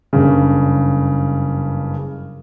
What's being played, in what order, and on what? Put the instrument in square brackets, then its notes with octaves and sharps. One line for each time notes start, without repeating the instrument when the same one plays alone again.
[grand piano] F#1 G2 C#3